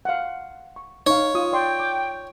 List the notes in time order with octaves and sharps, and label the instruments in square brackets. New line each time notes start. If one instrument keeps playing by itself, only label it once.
[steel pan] F5 F#5
C#6
[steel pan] D#4 F5 [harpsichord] C#5
[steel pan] F4 D#6
[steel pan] D5 C6 [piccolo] G5
[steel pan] D6